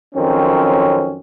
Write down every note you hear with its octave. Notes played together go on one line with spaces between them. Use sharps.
F2 D#3 F#3 C4 C#4